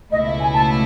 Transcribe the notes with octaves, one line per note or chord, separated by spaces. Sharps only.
C#2 B2 A3 E4 D#5
E5
G#5
A5